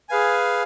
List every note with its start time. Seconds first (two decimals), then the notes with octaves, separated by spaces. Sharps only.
0.09 G#4 B4 F5 G#5